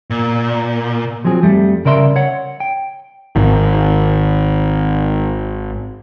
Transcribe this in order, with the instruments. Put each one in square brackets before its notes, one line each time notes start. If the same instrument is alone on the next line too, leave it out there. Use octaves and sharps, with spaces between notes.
[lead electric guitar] A#2
[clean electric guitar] F3 F#3 C4 G#4
F2 G3 A3
C#3 A#4 D5 E5 C6
C#5 F#5
G5
[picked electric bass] G#1 D#3